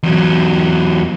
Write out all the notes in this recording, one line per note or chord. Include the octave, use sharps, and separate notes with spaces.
E2 F#3